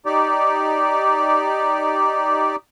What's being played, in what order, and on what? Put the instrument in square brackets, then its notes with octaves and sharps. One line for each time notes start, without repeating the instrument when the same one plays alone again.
[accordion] D#4 G4 D5